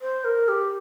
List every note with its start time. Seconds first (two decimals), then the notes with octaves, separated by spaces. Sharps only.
0.02 C5
0.24 A#4
0.48 G4